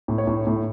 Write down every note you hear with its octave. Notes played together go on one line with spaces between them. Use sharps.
A2
C#5
A2
A2